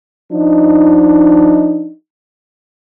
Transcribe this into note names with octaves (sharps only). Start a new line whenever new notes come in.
F3 D4 D#4